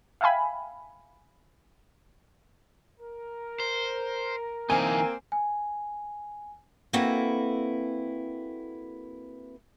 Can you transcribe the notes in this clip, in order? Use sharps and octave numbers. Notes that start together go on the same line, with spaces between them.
E5 F5 G5 G#5 B5
A#4
C5
E3 A#3 C4 D#4 G#5
G#5
A#3 C4 E4 F#4 A4 B4